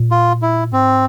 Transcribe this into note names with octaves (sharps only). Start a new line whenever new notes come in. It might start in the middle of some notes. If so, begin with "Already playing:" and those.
Already playing: A#2
F4
E4
G#2 C4